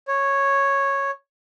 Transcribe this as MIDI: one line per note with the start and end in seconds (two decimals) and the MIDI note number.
0.08 1.11 73